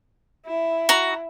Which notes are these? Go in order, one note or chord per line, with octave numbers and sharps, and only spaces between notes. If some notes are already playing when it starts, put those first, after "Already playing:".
E4
F#4 A#5